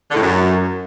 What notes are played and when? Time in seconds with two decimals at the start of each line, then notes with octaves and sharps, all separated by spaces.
0.11 D3
0.16 A2
0.21 F#2